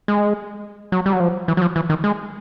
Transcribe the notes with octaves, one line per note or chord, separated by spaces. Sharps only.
G#3
F#3
G3
F#3
F3
E3
F#3
F3
E3
D#3
G#3